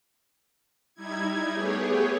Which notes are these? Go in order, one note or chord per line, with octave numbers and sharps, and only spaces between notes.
G3 D#4 E4 G#6
A3 B3 G4 G#4 C#5